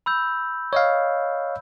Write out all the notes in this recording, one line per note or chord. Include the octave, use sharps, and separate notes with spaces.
B5 E6 G6
C#5 D#5 F5